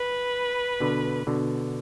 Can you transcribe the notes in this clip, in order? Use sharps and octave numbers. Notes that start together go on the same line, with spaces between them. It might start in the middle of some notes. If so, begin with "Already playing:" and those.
Already playing: B4
B2 D3
B2 D3